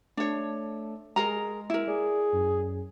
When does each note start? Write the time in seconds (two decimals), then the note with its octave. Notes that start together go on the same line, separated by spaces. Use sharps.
0.17 A3 D4 C#5
1.16 G#3 G#4 A#4 A#5
1.70 E4 A#4
1.87 G#4 D5
2.33 F#2